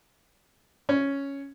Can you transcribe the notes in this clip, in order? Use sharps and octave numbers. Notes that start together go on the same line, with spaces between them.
C#4